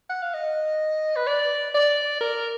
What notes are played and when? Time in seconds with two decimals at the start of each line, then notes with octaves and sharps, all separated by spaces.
0.10 F#5
0.22 F5
0.34 D#5
1.16 B4
1.27 D5
1.74 D5
2.21 A#4